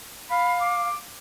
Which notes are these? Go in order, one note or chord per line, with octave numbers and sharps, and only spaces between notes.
F5 B5
D6